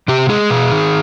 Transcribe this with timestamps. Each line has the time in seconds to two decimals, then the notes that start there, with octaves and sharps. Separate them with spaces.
0.08 C3 G4
0.29 G#3 G#4
0.50 B2
0.72 D#3